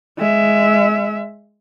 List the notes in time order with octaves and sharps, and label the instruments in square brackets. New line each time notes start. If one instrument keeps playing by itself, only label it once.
[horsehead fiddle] G#3 E5